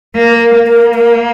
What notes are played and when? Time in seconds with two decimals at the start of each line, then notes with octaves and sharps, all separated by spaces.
0.16 A#3 A#4
0.41 A#4
0.55 A#3
0.67 A#4
0.95 A#4